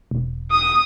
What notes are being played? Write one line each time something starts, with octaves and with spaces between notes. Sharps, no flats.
E1
D#6